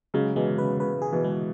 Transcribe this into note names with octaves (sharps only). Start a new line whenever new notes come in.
C#3 F#3 G#3
B2 E3 G#3
C#3 B4
C#3 B4
G#4
B2 E3
G#3